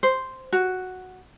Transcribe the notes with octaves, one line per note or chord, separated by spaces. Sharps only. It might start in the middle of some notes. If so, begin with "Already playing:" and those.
C5
F#4